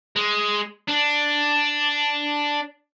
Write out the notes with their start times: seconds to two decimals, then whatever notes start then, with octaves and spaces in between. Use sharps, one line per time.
0.16 G#3
0.88 D4